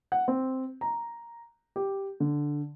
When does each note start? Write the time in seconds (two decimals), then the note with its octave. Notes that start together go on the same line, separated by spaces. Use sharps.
0.12 F#5
0.28 C4
0.81 A#5
1.76 G4
2.20 D3